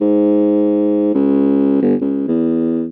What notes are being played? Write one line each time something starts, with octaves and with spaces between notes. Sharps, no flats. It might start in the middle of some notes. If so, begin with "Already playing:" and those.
G#2
C#2
G1
C#2
E2